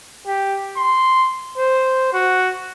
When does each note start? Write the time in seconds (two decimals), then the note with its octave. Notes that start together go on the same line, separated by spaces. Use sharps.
0.27 G4
0.77 C6
1.58 C5
2.13 F#4